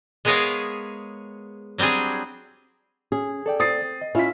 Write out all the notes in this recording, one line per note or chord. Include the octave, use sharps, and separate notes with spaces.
G#3 B3 G#4 A#4 C#5 F5
F#3 G3 C4 D4 G#4
C#4 G#4
A4 D5 G5
C4 D#6 A6 C7
D#5
C#4 E4 F4 B6